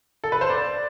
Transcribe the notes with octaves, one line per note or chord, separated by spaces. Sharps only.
A4
B4
C5
D5